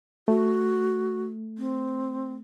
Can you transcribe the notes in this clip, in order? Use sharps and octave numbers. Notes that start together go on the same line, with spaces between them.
A3 F#4
C4